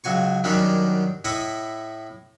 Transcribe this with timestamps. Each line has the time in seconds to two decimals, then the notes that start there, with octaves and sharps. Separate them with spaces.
0.04 C#2 F#3 G#5 C#6
0.44 F#2 D#3 F#3 G3 D4 G4
1.25 A2 E4 D#5 B5 C#6 D#6